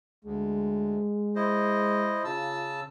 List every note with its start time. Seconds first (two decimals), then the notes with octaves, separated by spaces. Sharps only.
0.24 D2 G#3
1.35 E4 C5 D#5
2.24 C#3 F4 A5 E6